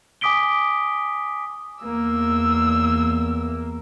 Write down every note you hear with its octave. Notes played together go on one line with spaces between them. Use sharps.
G#5 D6 D#6 B6 D7 G7
E2 A#3 E6